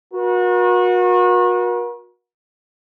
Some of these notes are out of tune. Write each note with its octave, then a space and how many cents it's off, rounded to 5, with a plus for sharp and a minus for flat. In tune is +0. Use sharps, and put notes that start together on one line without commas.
F#4 -35 A#4 +45